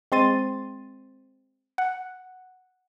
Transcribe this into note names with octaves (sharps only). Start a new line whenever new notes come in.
G#3 C4 C6 A6 D#7
F#5